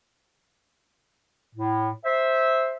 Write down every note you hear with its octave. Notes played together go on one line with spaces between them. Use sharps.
A2
C5 E5